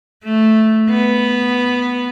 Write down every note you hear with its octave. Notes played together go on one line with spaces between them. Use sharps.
A3
B3